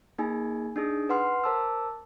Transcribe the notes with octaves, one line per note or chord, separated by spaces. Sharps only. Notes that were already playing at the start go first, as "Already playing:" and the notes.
A#3 D#4 G#4 G#5
D4 D#4 G#4 D#6
B4 F#5 C6 F6 C7
A#4 C5 A5 D6 E6